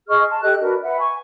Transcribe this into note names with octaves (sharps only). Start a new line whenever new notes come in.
G#4 D#5 C#6 F6
A5 C6
G4 A4 D#5 F#6
D4 F#4 A#4 B4
B4 E5 F#5
G#5 C#6